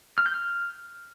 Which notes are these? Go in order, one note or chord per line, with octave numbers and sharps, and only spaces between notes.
F6
G6
F6